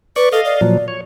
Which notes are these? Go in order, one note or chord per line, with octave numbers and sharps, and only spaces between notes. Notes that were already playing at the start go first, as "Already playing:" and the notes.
B4 D5 C#6
A4 D#5 F5
D5
A#2 F3 F#3
C#5